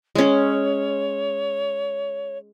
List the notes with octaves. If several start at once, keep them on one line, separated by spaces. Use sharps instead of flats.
G#3 C#4 C#5